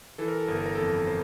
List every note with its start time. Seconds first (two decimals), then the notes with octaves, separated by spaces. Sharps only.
0.18 E3 A4
0.28 A#4
0.37 A4
0.47 G1 A#4
0.57 A4
0.66 A#4
0.75 F2 A4
1.07 C5